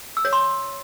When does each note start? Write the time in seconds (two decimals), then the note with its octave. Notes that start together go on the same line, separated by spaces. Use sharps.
0.17 E6
0.25 C#5
0.33 C6